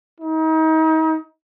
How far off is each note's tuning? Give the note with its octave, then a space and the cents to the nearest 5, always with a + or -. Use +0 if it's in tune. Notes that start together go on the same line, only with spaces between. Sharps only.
D#4 +35